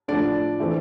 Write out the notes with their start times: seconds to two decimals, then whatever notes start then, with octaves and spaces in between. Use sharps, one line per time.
0.08 A2 F3 A3 D4 D5
0.60 E3 A3 C4